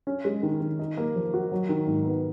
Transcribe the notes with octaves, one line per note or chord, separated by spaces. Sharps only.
C#4
G#3
D#3
D#3
D#4
A#3
F3
F#4
F#3
D#3
G#2
B3